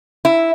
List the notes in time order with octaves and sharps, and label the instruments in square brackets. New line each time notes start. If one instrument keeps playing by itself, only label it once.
[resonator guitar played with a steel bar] E4